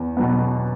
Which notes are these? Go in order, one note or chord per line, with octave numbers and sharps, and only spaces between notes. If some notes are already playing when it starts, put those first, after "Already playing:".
Already playing: E2
B2 F#3 B3